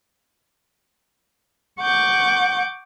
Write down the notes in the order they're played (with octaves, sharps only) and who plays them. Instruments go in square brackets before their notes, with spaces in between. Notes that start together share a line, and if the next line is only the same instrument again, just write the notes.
[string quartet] F#5 C#6 D6 G6